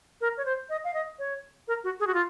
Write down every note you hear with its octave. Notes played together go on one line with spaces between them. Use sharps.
A#4
C#5
C5
D#5
F5
D#5
C#5
A#4
F#4
G#4
F#4
F4